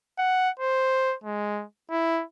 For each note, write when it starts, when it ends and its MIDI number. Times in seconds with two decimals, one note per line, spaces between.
0.18 0.49 78
0.59 1.15 72
1.24 1.64 56
1.90 2.23 64